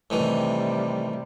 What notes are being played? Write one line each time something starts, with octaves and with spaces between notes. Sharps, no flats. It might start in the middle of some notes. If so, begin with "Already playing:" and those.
A2 C3 D#3 E3 G3